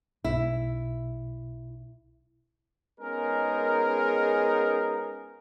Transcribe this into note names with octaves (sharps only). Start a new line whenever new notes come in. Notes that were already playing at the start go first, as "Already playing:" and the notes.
B1 E4
G#3 B3 C#4 D#4 G#4 A#4